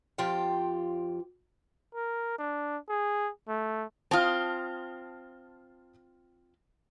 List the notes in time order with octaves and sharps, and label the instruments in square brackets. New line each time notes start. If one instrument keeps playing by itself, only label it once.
[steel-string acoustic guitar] F2 F3 F4 G4 G5
[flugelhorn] A#4
D4
G#4
A3
[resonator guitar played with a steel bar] C4 F4 [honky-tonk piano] A5 D#6 F6